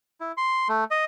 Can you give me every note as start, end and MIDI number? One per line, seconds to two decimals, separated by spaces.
0.21 0.32 64
0.37 0.68 84
0.69 0.84 57
0.91 1.05 75